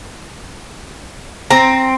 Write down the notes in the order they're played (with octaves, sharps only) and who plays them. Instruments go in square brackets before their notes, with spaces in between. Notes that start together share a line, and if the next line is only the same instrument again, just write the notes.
[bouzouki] C4 [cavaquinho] A#5